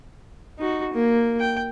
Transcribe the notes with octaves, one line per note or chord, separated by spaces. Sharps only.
D#4 F#4
A#3
G5